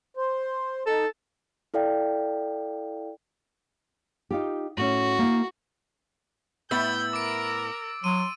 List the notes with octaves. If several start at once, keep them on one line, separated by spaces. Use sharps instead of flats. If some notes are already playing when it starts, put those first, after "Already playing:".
C5
D#4 A4
E4 A4 D5 F5 G5
D#4 F4 G4
A2 C#4 F#4
A#3 E4
A2 B3 E4 E6 G6 A6
A#4 D6 D7
F#3 C6 D#7